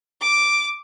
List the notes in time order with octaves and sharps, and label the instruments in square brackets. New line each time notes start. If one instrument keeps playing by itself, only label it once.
[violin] D6